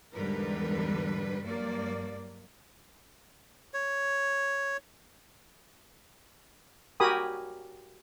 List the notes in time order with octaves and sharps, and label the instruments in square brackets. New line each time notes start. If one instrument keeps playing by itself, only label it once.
[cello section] E2 G#2 D3 G3 A#4 B4
G2 F#3 A#3 D5
[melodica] C#5
[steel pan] F#4 G4 A#4 G#5 B5 D#6